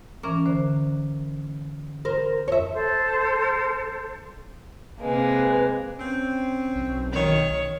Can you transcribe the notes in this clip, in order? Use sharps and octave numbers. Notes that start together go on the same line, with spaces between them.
E3 C#4 A#4 D6
D3 C5
A#4 C5
F2 C#5 E5
A4 C5
C3 G#3 A#3 B4
C4 C#4
B1
D#3 C#5